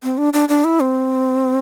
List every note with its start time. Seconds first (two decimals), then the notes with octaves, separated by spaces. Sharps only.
0.03 C4
0.18 D4
0.33 D4
0.49 D4
0.64 E4
0.80 C4